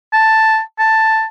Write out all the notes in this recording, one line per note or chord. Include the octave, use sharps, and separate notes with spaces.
A5
A5